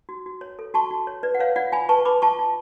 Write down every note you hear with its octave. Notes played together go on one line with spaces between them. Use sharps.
F#4
F#4
C#5
A4
F#4 A5 C#6
F#4
C#5
B4 D5
F#5
B4 C#5 F5
F4 D5 F#5
F4 G#5 B5
B4 A5 C#6
B4 B5 D6
F4 A5 C#6
F4